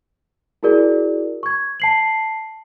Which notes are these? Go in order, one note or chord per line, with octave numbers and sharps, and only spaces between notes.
E4 F#4 G#4 A#4 D5
C#6 G#6
A5 C7 F#7